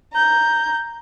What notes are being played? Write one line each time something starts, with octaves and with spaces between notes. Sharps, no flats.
A#5 G6